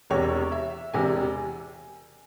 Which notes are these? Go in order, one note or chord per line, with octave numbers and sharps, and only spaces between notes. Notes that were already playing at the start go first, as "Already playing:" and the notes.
E1 E2 C3 C#5
E5
E1 E2 C3 G#5